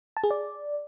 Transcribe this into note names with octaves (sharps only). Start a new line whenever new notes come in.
A5
G#4
D5